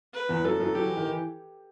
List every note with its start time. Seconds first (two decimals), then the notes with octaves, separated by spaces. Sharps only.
0.14 B4
0.29 E2 E3
0.44 F#2 F#3 A4
0.60 F#2 F#3
0.75 F#3 G4
0.86 E3
0.97 D#3
1.07 E3